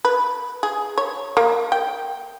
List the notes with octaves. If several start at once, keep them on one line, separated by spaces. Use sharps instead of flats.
B4
G#4
C#5
A#3
G5